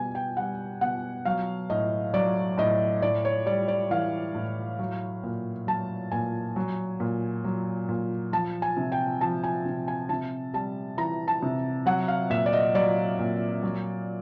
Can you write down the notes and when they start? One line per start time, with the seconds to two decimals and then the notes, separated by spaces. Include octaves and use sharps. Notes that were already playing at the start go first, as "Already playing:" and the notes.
Already playing: B2 G3 G#5
0.15 G5
0.37 G3 F#5
0.81 B2 F#5
1.25 F#3 F5
1.70 A2 D#5
2.14 F#3 D5
2.58 A2 D#5
3.02 A2 D5
3.25 C#5
3.46 G3 D5
3.68 D5
3.90 E3 F5
4.35 A2
4.79 F#3
5.23 A#2
5.67 F#3 A5
6.12 A#2 G#5
6.56 F#3
7.00 A#2
7.44 F#3
7.89 A#2
8.32 F3 A5
8.62 G#5
8.77 C3
8.92 G5
9.21 F3 A5
9.44 G#5
9.66 C3
9.88 G#5
10.09 C3 A5
10.54 G3 A5
10.97 E3 A#5
11.28 A5
11.42 C3
11.86 F#3 F#5
12.08 F5
12.30 A#2 E5
12.46 D5
12.53 D#5
12.74 F#3 D5
13.19 A#2
13.63 F#3